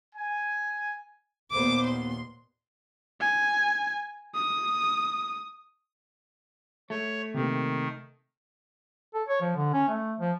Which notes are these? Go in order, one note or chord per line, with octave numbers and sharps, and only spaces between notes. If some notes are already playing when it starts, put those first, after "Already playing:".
G#5
D#2 A#2 B3 C5 D6
C6
G#5
D#6
A3 C#5
C3 D#3 A#3
A4
C#5
F3
D3
C#4
A3
F3